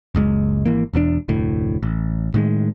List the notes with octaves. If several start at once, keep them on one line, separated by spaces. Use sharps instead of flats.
F#1 C#2 C3 G#3
G#1 E3 A#3
E1 E2 D#3 D4
F1 D2 A2
A1
A2 D#3 G#3